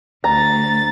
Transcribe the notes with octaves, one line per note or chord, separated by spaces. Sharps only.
D2 A#5 A6